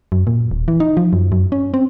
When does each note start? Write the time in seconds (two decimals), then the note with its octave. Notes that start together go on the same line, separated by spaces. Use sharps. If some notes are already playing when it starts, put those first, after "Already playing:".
0.12 F#2
0.27 A#2
0.51 D#1
0.68 E3
0.80 D#4
0.97 F3
1.13 F#2
1.32 F#2
1.52 C#4
1.74 C4